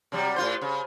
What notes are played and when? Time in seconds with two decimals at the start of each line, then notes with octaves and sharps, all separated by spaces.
0.12 C3 F#3 G3
0.36 A2 F4 C5
0.61 C#3